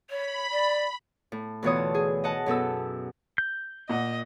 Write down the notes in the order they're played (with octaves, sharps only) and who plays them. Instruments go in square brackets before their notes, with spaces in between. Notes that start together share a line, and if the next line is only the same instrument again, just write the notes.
[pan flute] C#5 [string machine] B5
[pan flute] D5
[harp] A2
D2 B2 E3 F4 C#5 D#6
A5
G#4
D#5 F#5 A5
F#2 B2 A4 E6
[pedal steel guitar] G6
[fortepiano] A#2 F#5 [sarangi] D#5